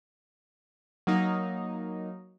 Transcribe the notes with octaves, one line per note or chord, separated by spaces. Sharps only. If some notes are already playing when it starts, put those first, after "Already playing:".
F#3 A#3 D#4